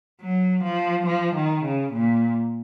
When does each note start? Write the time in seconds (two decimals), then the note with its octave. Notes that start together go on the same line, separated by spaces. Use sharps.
0.21 F#3
0.64 F3
1.06 F3
1.35 D#3
1.64 C#3
1.93 A#2